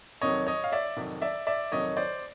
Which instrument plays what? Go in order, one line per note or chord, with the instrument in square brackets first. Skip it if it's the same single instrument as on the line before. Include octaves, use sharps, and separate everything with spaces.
[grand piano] F2 C3 D#3 F#3 C#5 D#5
C#5 D#5
F5
D5 E5
F2 C3 D#3 F#3
D5 E5
D5 E5
F2 C3 D#3 F#3 C#5 D#5
C5 D5